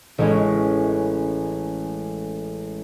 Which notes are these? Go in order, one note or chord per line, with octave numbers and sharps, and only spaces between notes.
A1 G#3 C#4